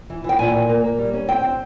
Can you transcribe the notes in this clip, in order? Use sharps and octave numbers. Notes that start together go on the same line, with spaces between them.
E3
E3 G5
A#2 G#5
A#2
A#3
A#3
G3
C#4
C4 G5
C4